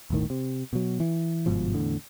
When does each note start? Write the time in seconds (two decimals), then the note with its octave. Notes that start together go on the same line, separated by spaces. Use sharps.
0.10 D#1 G#1 A2 D#3
0.30 C3
0.73 B2 F#3
1.00 E3
1.46 G1 G#2 B2 F3
1.73 E2 A2 D3